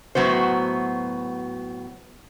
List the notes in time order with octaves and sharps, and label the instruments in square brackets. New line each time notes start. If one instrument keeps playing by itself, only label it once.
[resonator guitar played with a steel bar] A2 F#3 B3 F#4 C5